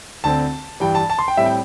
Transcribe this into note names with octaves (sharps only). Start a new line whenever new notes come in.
D2 D3 C4 A5
G2 E3 G3 G5
A5
A5
C6
G5
A2 G3 C4 E5
G5